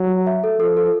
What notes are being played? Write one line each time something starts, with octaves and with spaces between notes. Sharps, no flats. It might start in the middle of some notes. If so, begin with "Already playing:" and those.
Already playing: F#3
F#4
E5
A4
F3 A4
A4